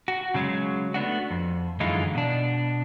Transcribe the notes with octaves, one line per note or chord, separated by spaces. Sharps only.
F#4
C#3 F3 F#3 G#3
A3 B3 D4 F#4
F2
F#2 D3 E3 G#3 D#4 F4
B2 D4